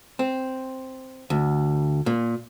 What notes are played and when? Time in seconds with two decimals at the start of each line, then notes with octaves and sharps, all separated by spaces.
0.19 C4
1.30 D2
2.06 A#2